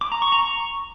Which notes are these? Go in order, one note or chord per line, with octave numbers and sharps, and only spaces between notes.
D6
A#5
C#6
A#5
C#6